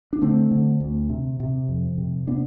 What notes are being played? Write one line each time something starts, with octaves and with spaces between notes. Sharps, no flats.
D4
D3 A3 C4
D3
D2
C3
C3
F2
C3
C3 B3 D4